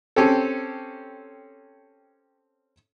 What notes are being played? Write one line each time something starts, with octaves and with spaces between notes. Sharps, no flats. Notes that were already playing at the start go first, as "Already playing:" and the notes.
C4 C#4 G4 A4